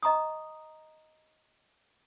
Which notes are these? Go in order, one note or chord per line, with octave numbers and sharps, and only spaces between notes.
D#5 A#5 C#6 D#6